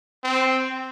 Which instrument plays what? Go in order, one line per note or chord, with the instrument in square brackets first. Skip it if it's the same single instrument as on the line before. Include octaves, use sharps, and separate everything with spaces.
[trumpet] C4